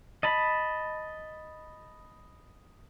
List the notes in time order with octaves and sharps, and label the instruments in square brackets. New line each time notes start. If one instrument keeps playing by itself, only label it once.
[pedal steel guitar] D#5 A5 B5